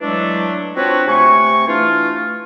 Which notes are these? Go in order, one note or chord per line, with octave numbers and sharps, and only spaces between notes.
E3 F#3 G#3 A3 D4
C4 D4 F4 F#4 B4 C#5
C3 A3 G#5 C#6
E3 A3 D4 F4